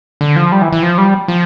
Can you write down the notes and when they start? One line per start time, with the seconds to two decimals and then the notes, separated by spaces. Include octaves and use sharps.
0.21 D3
0.36 F3
0.52 G3
0.62 E3
0.73 E3
0.83 F3
0.98 G3
1.28 F3